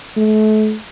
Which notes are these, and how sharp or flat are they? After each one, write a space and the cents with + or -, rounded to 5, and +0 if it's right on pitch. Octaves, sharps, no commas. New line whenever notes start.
A3 -35